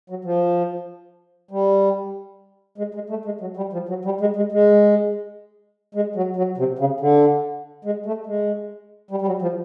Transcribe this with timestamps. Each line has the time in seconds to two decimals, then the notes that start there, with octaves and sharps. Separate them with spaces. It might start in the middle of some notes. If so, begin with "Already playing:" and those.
0.10 F#3
0.25 F3
1.51 G3
2.78 G#3
2.94 G#3
3.10 A3
3.25 G#3
3.41 F#3
3.57 G3
3.73 F3
3.89 F#3
4.05 G3
4.21 G#3
4.36 G#3
4.52 G#3
5.95 G#3
6.16 F#3
6.36 F#3
6.57 C3
6.79 C#3
7.00 D3
7.85 G#3
8.06 A3
8.26 G#3
9.11 G3
9.22 G3
9.26 F#3
9.42 F3